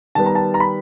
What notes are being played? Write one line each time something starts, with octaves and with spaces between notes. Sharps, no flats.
D#3 G3 B3 A5
A#5
A5
A#5
B5